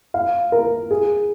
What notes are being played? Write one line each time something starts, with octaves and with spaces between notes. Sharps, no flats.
F5
A#4
G#4